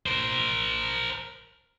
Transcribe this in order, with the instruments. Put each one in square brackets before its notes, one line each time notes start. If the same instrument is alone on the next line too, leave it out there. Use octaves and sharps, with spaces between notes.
[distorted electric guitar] A#4 C5